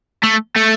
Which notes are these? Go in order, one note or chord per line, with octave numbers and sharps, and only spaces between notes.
A3
A3